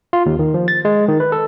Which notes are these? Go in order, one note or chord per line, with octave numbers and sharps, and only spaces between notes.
F4
D#2
D#3
F3
A6
G#3
D#3
B4
A4